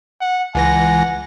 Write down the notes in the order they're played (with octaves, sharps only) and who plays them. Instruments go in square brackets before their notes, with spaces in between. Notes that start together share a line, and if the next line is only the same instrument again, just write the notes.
[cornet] F#5
[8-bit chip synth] C#2 E3 A#6 [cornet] F#5 [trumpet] G#5